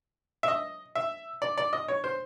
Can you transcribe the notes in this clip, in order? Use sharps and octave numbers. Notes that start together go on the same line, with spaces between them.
E5
D#5
E5
D5
D5
D#5
C#5
C5